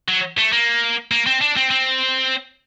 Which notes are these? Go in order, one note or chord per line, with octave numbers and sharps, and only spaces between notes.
F#3
A3
A#3
A#3
C4
D4
C4
C4